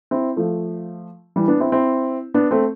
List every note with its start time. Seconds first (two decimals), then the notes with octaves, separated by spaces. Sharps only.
0.11 C4 E4
0.37 F3 A3
1.36 E3 G3
1.48 B3 D4
1.60 C4 E4
1.72 C4 E4
2.34 B3 D4
2.51 A3 C4